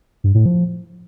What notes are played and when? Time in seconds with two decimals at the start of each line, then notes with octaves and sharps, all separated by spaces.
0.24 G2
0.35 A2
0.46 F3